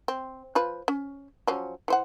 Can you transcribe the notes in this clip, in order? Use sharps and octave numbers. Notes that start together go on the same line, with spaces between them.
C4
F3 F4 B4
C#4
F3 F#3 C#4
E3 C5 F#5